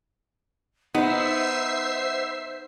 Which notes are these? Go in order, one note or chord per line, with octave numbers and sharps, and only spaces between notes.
B3 D#4 C5 E5 E6 C7